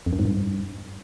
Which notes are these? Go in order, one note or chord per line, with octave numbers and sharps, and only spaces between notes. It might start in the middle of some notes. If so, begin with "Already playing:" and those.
F2
F#2
G#2
G2